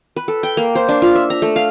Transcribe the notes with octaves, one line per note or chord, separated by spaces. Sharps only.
B4
A4
G5
A#3
C5
D4
F4
E5
A#5
A3
F5